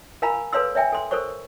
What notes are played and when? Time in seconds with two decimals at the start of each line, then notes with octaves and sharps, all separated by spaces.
0.22 A#4 F5 G#5 A#5 B5
0.53 A4 B4 C#5 F5 C6 E6
0.75 C#5 E5 G5 G#5
0.92 A4 C6
1.11 A4 A#4 C5 C#5 C#6